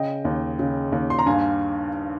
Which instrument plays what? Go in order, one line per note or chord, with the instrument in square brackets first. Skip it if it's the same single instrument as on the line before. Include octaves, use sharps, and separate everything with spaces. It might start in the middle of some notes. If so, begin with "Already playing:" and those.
Already playing: [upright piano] C#3 D#5 G5
D#2
C#3
D#2
C6
A#5
G2 F5 G#5